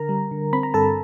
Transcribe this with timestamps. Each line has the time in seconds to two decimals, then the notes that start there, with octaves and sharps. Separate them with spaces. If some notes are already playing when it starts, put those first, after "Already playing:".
Already playing: D3 A#4 A#5
0.09 G3
0.31 D3
0.53 C4 B5
0.63 A#5
0.74 G2 A4 A5